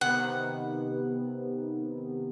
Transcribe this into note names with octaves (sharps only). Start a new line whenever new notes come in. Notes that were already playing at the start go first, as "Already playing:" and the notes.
C3 D#3 B3 F#5